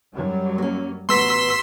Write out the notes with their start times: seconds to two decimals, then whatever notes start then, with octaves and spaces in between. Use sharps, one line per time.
0.14 F#2 F#3 G3
0.58 A#3 C#4
1.09 A1 B3 F#4 A#5 C6 E6 B6